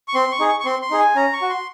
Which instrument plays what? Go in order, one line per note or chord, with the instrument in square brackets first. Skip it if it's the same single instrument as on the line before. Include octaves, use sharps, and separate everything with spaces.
[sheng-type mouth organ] C#6
C4 C6
C#6
D#4 G#4
C#6
C#6
C4 C6
C6
D#4 G#4
G#5
C#4 A#5
C#6
F#4
C6